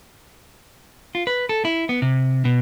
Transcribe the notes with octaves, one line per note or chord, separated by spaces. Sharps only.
F4
B4
A4
E4
B3
C3
B2